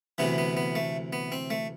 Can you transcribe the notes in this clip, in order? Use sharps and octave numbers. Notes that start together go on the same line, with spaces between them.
D2 C3 E3 B3
B3
B3
A3
B3
C4
A3